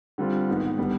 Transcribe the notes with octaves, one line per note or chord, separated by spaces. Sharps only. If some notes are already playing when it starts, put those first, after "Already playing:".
D3 G3 C4 F4
G#2 D#3 G#3 B3
D3 G3 B3